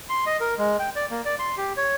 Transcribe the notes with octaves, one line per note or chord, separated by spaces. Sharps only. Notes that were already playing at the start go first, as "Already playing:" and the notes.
C6
D#5
A#4
G#3
G5
D5
A#3
D5
C6
G4
C#5